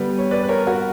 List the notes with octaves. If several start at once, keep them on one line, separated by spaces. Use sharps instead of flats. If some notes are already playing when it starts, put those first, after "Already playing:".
Already playing: D3 G3 B3 B4
C#5
B4 D5
B4
A#4 C#5
F#4 A#4